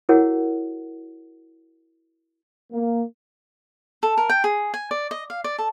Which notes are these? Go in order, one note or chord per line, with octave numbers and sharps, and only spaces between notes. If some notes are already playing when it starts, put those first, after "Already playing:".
E4 F#4 G#4 A#4 C#5 F#5
A#3
A4
A#4
G5
G#4
G#5
D5
D#5
F5
D5
A4